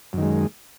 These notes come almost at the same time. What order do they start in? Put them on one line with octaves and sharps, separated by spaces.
F#2 D#3 G#3